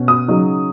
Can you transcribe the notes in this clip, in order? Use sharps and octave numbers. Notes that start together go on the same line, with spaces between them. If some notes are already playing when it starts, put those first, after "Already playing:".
Already playing: B2 C#4
D#6
C#3 F#3 D#4